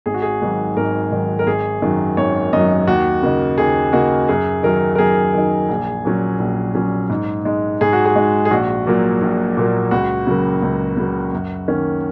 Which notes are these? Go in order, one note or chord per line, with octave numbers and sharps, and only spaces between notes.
G#1 G#4
F#4
G#4
G#2 D#3 F#3
G#1 A#4
G#2 D#3 F#3
A#4
G#1 G#4
F#2 D#3 F#3
G#1 C#5
F#2 D#3 F#3 D#5
D#2 F#4
C#3 A#3 D#4
D#2 G#4
C#3 A#3 D#4 F#4
F#2 G#4
D#3 F#3 D#4 A#4
A#4
F#2 G#4
D#3 F#3 D#4
A#1
A#2 F#3 C#4
A#1
A#2 F#3 C#4
G#2
G#3 D#4
G#2 G#4
F#4
G#4
G#3 D#4
G#4
A#1 F#4
A#2 F#3 A#3
A#1
A#2 F#3 A#3
C#2 F#4
C#3 F#3 A#3
C#2
C#3 F#3 A#3
F#2
D#3 A#3 C#4